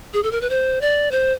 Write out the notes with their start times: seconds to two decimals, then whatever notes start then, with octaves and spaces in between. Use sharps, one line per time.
0.14 G#4
0.23 A4
0.32 A#4
0.41 B4
0.50 C5
0.81 D5
1.11 C5